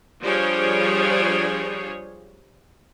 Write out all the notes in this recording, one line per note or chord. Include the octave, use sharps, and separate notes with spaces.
F3 G3 D4 G#4 C5 C#5